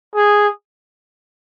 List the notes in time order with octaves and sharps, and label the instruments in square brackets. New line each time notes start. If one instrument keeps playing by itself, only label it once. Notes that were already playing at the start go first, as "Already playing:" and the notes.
[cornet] G#4